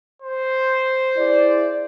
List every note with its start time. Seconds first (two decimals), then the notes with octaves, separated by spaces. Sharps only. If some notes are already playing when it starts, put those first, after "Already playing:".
0.22 C5
1.16 E4 G#4 D5